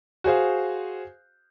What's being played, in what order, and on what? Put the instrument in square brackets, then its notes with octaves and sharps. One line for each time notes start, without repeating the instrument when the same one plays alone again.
[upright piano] F#4 G#4 C5 F5